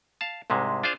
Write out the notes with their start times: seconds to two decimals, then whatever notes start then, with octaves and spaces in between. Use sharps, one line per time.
0.21 F5 A5
0.50 C2 G#2 C3 G#3
0.84 D4 F4 G#4 C5 F5